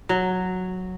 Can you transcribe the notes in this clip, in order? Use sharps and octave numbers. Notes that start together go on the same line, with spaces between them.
F#3